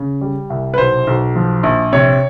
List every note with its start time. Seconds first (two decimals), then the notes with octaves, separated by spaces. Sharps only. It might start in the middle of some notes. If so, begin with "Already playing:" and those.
Already playing: C#3
0.21 G3
0.50 C2
0.74 B4
0.78 B1 C5
1.07 B1
1.36 F3
1.63 A#1
1.93 C3 C#5